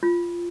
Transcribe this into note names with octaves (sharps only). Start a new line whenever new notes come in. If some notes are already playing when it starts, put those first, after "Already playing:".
F4